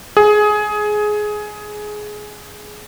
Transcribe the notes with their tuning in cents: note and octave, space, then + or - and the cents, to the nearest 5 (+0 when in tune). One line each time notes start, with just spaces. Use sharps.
G#4 +15